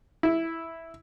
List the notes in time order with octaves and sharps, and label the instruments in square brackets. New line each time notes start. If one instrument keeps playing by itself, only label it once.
[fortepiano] E4